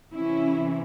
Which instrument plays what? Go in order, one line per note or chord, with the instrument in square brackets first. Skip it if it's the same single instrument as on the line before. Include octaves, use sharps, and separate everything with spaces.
[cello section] C3 E3 C#4 E4